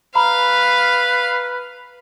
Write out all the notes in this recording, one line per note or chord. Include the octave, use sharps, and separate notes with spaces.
B4 F5 A#5 B5